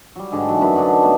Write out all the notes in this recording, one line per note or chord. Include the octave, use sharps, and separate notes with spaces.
F#3 G3
G#2 D3 D4
E3 F#3
F#2 D4 B4
D3 D4 D#4 F#5
G3 A3 B3